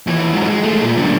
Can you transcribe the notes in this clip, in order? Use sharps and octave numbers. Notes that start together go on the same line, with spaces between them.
D#2 E3
G#2 F#3
G#3
G#3 A3
A#2
F#2 D3